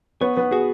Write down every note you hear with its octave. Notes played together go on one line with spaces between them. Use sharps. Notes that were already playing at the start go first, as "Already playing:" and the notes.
B3 B4 C#5
B3 B4
F#4 G#4